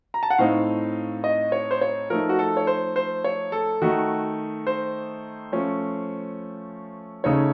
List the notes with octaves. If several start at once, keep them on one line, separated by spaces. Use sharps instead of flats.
A#5
A5
F#5
A2 A3 C4 D#4 F5
D#5
C#5
C5
C#5
F3 A3 D#4 A#4
F#4
A4
C#5
C5
C5
C#5
A4
D#3 A3 D#4 F#4
C5
F3 A3 C#4
C#3 A3 D#4 C#5